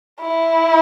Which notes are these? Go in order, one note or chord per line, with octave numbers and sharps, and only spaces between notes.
E4